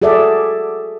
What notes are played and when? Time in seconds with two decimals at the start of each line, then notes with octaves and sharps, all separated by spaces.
0.02 F#4 G#4 A4 D5 E5